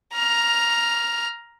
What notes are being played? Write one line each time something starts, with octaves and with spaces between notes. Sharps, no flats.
A#5 F6